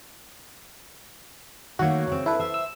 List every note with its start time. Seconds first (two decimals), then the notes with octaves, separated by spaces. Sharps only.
1.79 D#3 A3 A#3 F#4 C#5
2.07 C#3 C4
2.26 D4 E4 G#4 A4 B4
2.39 C5 E5
2.54 E6